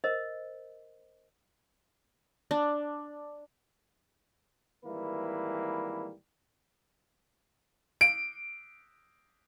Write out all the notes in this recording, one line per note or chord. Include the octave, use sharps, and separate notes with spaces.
A#4 C5 D#5
D4
G#1 E3 G3 A#3 E4 B4
D7